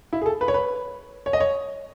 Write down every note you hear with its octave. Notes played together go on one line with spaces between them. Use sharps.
E4
G#4
A4
B4
C#5
B4
C#5
D#5
C#5